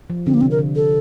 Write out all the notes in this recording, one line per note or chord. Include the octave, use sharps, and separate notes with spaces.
F3
D3 C4
A#3
C3 C4
A#4
D3
A4